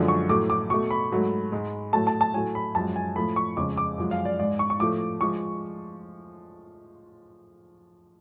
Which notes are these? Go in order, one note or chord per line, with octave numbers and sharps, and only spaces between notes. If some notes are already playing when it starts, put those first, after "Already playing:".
Already playing: F#2 D3 F3 G#3
C#6
A2 F#3 A3 D6
D6
B2 A3 C#6
B5
G#2 F#3 A3
G#2 G#3
A2 F#3 A3 A5
A5
A5
A2 F#3 A3 G#5
B5
F#2 F3 G#3 A5
G#5
A2 F3 A3 B5
C#6
F2 C#3 G#3 D6
D6
F#2 F3 G#3
F5
D5
G#2 G#3 D5
C#6
C#6
A2 F3 A3 D6
F3 G#3 C#6